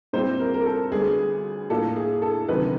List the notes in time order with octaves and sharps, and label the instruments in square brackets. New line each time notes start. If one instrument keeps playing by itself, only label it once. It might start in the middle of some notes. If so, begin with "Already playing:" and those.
[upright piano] A#2 G3 C4 E4 C5
A#4
A#4
A4
D2 D3 G3 B3 G#4
A2 F3 A#3 D4 A4
G#4
A4
D2 C3 D#3 F#3 B3 B4